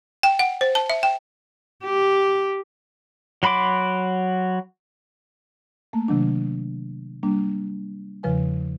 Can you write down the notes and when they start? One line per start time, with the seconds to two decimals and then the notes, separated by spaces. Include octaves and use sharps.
0.23 G5
0.39 F#5
0.61 C5
0.75 A5
0.90 E5
1.03 G5
1.83 G4
3.43 F#3 F#4 B5 C6 D6
5.93 A3 A#3
6.08 C3 D#3 F#3 D4
7.23 G3 A#3 D4
8.23 E2 C#3 F3 B4 G#5